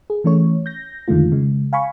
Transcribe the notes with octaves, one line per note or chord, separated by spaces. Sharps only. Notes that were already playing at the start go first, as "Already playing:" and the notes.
G#4
E3 A3 C#4 C#5
G6 A#6
F2 D3 D#3 G#3 A3 F4
C#3 G#3
F5 G#5 B5 C#6